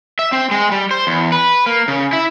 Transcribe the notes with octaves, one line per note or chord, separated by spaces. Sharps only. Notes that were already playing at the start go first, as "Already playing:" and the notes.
E5
C4
G#3
G3
C5
E2
B4
A#3
C#3
E4